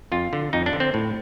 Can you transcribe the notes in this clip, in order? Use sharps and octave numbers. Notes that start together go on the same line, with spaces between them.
F2 F4
D3
F2 D#4
D4
D3
C4
A2